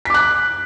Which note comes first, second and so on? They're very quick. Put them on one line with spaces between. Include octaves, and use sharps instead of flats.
B6 D6 F#6